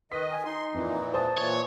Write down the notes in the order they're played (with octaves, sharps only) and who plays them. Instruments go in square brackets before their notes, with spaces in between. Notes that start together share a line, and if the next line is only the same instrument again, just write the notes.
[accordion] D#3 D#5 [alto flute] B4 [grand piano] B6
[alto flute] G#5
[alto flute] D#4 [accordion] C6
[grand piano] F2 [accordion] A#2 E3
[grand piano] C5 A5 D#6 [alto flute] D5
[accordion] A#2 E3 [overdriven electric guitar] C#5